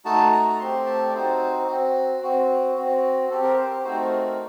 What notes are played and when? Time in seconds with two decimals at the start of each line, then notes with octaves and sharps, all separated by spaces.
0.05 A3 D#4 F#4 A5
0.32 A#5
0.49 A#5
0.59 A3 C4 G4 C6
0.86 A5
1.09 D5
1.14 C4 D#4 F#4 C5
1.67 C4 F#4
2.22 C4 F#4
2.76 C4 F#4
3.30 C4 G4 A4
3.43 A#4
3.57 C5
3.84 A3 C4 D#4 F#4 C5
4.02 A#4
4.20 A#4